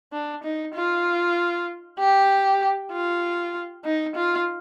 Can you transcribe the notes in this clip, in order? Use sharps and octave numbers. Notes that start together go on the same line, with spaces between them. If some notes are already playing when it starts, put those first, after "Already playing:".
D4
D#4
F4
G4
F4
D#4
F4